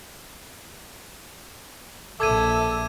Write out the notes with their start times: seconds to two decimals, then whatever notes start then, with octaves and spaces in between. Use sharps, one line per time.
2.20 A#1 A4 E5 D6 G#6 D#7